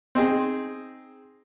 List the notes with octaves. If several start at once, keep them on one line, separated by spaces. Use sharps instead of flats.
C4 D#4 G#4